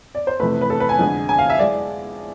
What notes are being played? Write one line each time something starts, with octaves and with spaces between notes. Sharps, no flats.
D5
C5
F2 C3 E3 A3 B4
B4
A4
B4
G#5
F2 D3 G#3
G#5
F5
E5
G#3 D5